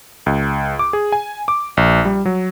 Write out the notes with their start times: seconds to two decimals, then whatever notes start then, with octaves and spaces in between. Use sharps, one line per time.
0.26 C#2
0.79 D6
0.93 G#4
1.12 G#5
1.48 D6
1.77 A#1
2.05 G3
2.25 F#3